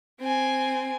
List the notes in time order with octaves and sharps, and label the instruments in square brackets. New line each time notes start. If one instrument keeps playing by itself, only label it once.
[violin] C4 G#5